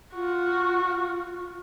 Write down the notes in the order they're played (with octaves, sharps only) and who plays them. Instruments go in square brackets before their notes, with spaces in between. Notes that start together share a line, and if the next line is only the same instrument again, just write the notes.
[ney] F4 [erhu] F#4